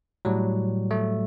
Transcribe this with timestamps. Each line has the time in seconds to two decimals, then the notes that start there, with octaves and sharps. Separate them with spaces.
0.25 A2 F#3 G3
0.91 A3